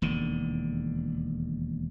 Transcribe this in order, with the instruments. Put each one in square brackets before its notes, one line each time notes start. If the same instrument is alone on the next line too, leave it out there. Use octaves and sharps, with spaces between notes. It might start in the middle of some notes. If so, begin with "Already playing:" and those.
[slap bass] E1 D#2 D3